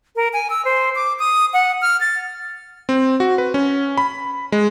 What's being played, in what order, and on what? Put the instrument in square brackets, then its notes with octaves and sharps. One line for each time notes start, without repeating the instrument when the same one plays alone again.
[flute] A#4
G#5
E6
C5
D6
D#6
F#5
F6
A6
[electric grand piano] C4
F#4
B4
C#4
B5
G#3